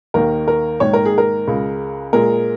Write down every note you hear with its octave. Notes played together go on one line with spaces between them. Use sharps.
D#2 D#3 A#3 A#4
A#4
G#2 D#3 A#3 C#5
A#4
G#4
A#4
C#2 C#3 G#3
A#2 G#3 A#4